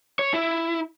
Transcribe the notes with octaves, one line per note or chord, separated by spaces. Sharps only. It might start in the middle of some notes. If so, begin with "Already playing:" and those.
C#5
E4